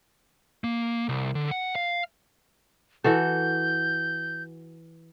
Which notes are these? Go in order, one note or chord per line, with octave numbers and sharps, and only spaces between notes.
A#3
C2
D3
F#5
F5
E3 F#4 A4 G6